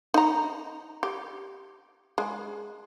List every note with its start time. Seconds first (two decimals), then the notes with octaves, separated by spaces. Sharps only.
0.14 D#4 A#5
1.03 G4
2.18 G#3